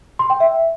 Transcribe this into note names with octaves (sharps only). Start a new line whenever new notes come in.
C6
G5
E5